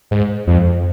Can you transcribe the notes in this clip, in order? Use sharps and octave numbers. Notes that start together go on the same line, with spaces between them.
G#2
F2